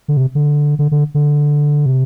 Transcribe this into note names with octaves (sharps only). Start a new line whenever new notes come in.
D3
C3
D3
D3
D3
D3
C3